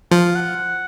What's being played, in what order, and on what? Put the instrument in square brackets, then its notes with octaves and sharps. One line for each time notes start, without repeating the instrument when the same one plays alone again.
[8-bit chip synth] F3 [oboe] F5
[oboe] F#5